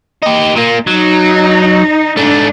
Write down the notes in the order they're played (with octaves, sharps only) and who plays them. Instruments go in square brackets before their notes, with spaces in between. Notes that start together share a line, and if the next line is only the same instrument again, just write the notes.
[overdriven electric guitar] D#4 G4
A#2 A#3
[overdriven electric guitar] F#3 [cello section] D#4
[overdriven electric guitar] G#2 A3 [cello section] D4